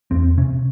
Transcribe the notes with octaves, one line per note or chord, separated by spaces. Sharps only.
E2 C4
C3 C#4